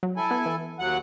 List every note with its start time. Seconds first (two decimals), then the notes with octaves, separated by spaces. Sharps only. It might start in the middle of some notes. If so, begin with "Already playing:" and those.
0.03 F#3
0.17 E4 A4 G#5
0.31 B3
0.46 E3
0.79 D#2 F#3 F#5